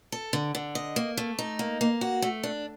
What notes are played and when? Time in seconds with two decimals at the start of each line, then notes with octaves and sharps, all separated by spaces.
0.12 A4
0.33 D3
0.55 D3
0.75 D#5
0.96 A#3
1.17 A3
1.39 D#4
1.59 A#3
1.81 A#3
2.01 F#4
2.22 A3
2.43 D4